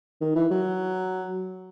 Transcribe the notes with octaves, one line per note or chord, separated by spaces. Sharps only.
D#3
E3
F#3